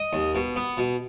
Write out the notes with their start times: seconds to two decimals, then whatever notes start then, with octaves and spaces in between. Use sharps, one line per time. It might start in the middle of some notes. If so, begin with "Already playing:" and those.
Already playing: D#5
0.13 D#2
0.35 B2
0.56 B3
0.77 B2